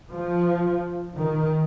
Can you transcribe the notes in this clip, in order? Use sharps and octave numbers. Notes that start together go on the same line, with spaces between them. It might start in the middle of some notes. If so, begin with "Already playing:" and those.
F3
D#3